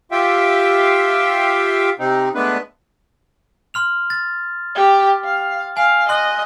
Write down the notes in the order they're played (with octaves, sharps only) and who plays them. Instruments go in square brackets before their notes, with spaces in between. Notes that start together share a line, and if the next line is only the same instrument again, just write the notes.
[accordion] F4 G4 E5 F5 G5
C3 C4 D#4
G#3 A3 B3 D4 B4
[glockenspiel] C6 F6 F7
A6
[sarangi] G4
F5
[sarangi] F5 [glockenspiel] G#5
[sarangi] D#5 [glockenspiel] C6 F#6